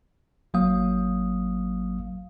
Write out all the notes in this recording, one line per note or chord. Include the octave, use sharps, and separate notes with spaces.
G#1 F#3 A#3 F5 D#6